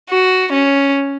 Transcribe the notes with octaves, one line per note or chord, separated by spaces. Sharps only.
F#4
C#4